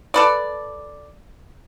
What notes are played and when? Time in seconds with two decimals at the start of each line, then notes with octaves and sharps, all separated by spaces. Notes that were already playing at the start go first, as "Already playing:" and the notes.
0.14 A4 B4 D5